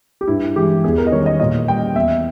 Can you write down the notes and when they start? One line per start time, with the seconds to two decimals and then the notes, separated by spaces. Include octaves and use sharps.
0.21 G4
0.28 G2 E4
0.56 E3 G#3 G4
0.84 E2 G#4
0.98 A#4
1.07 D#5
1.12 D#3 G3 C#5
1.26 D#5
1.40 A#2 D#5
1.67 G3 G5
1.96 E2 E5